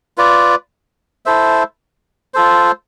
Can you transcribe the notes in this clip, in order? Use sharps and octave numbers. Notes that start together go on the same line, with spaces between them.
F4 B4 D5
E4 A4 C5 E5
F4 A4 C5